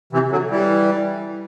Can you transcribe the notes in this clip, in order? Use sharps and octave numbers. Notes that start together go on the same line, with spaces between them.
C3 E3
D3 F#3
E3 G3